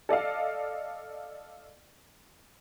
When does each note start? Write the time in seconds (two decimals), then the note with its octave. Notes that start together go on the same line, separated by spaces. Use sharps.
0.09 A4 D5 D#5 F5